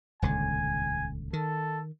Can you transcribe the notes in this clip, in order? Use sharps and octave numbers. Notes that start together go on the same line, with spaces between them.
D#1 C#2 D3 G#5
D#3 A4